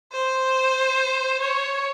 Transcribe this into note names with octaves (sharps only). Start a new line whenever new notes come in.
C5
C#5